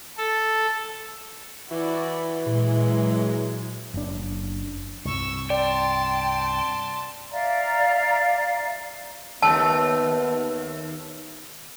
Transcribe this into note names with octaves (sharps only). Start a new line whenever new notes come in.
A4
E3 E4 F#4 D5
A#2 F#3 G#3
F#1 D4
C2 G2 C#6 E6
D5 G5 A5 C6
D5 E5 F5 A#5
D#2 A3 B3 A5 E6